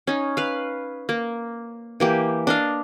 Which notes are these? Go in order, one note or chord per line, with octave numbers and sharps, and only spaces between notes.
C#4 D#4
B4 F5
A#3
E3 A#3 G4
D4 D#5 F5